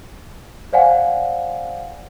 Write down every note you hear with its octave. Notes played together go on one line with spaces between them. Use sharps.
C5 D5 F5 F#5 G#5